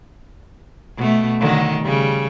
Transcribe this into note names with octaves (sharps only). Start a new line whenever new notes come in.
B2 A3
D3 D#3 F#3
C#3 G3